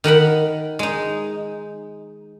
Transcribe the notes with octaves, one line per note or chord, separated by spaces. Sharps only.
D#3 A#4 F#5 B5
G#3 D#4